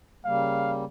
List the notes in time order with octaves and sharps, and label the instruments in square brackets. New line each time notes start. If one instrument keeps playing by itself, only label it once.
[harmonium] C#3 G3 A#3 [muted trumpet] F5